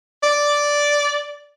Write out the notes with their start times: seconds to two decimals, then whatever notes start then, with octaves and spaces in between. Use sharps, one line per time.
0.23 D5